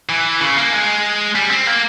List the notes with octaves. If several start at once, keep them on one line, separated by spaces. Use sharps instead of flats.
E3
C#3
A#3
G#3
G3
C4
A#3